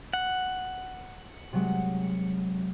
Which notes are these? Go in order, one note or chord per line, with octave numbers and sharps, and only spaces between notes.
F#5
C3 F#3 G#3